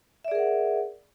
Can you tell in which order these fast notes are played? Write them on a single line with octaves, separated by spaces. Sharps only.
E5 D5 G#4 A#4 F#5